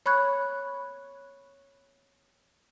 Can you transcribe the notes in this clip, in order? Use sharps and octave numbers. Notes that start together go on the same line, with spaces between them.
C#5 B5 C#6 F#6 G#6